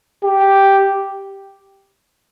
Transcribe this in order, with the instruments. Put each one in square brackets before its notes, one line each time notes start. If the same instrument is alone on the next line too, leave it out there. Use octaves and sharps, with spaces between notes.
[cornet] G4